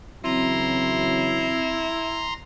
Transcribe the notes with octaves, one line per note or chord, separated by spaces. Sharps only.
C#3 E3 F#3 C4 E4 A#5 C6